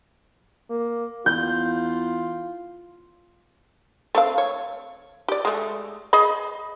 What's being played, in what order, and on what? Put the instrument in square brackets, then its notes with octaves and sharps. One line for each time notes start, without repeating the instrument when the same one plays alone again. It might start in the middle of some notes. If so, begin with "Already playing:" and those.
[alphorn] A#3
[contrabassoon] E2 [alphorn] F4 [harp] G6
[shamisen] A3 C4 F5
C#5
G4 D5
G#3 A3
G#4 D#5 B5